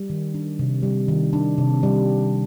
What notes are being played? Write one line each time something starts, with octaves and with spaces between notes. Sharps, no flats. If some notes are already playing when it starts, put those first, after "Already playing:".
Already playing: G3
D#3
D4
C3
G3
D#3
D4
C3
G3